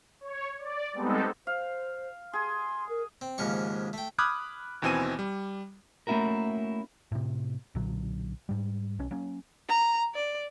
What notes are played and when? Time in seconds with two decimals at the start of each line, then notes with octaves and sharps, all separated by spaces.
0.21 C#5
0.59 D5
0.93 G3 G#3 B3 C4 D#4 A4
1.47 C5 F5
2.33 G#4 C6
2.89 A#4
3.21 C4
3.38 D#2 G#2 C#3 F3 G#3 C#6
3.93 A3 G5
4.18 B5 D6 D#6 F6 F#6 G#6
4.82 D#2 B2 E3 C4 G#5 D#7
5.19 G3
6.07 A3 A#3 C#4 E4 F#4 A#4
7.12 A2 C3
7.75 B1 A#2 D3 F#3
8.49 G#2 G3
8.99 B1 C#4
9.11 F#3 A#3 C#4
9.69 A#5
10.15 D5